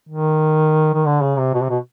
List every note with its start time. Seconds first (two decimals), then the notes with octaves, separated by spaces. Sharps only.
0.09 D#3
0.94 D#3
1.06 D3
1.22 C#3
1.38 C3
1.54 B2
1.62 C3
1.70 B2